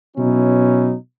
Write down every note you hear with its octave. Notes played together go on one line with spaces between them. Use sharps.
B2 F#3 C#4 D#4 E4